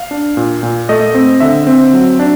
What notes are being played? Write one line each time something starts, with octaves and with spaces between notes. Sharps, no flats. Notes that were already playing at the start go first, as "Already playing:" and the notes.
Already playing: F5
D4
A#2
A#2
A3 D#5
C4
D3 E5
C4
F#3
D4